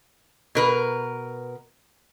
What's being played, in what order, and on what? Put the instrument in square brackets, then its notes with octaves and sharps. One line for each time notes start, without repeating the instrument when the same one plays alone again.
[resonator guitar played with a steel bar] B2 A#4 B4